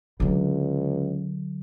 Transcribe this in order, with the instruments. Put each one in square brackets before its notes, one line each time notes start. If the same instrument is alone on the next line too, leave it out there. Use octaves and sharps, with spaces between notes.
[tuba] C#2 [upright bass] D3 F#3